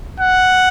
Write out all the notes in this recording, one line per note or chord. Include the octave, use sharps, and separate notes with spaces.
F#5